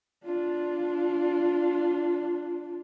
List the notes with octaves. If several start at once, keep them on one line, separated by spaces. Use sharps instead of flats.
D4 F4